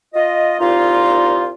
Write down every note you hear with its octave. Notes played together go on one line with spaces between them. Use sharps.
F4 D#5
C2 A#2 D#4 F4